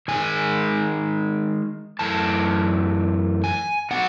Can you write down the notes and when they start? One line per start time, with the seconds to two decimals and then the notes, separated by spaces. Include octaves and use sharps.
0.08 D#3 G#3 D#4 G#5
1.99 F#2 E3 A3 A5
3.44 G#5
3.91 F#3 B3 D#4 F#5